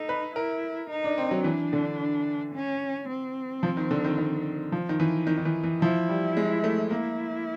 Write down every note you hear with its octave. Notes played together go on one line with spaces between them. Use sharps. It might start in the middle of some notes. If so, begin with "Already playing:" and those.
Already playing: D#4 A4
B4
E4 A#4
D#4
D4
C4
F#3
E3 D4
D3
C#4
C4
F3
D#3
D3
D#3
D#3
F3
D#3
E3
D#3
D#3
E3
E3
F3 E4
G3
G#3
A3
A#3 E4